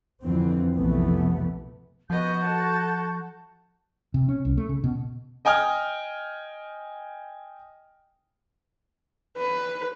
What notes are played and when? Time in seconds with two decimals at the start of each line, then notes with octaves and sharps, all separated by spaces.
0.24 F2 D3 E3 F3 C4
0.78 B1 F2 C3 E3 A3 B3
2.10 F3 B3 F#4 D#5 G6
2.44 A4 A5
4.14 C3
4.29 C#4
4.45 C2
4.57 A3
4.69 C#3
4.84 B2
5.45 D#5 G5 G#5 D#6 F6
9.37 B4